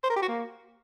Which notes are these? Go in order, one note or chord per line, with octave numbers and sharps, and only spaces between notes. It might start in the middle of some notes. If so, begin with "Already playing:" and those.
C5
A#4
G4
F#4
A#3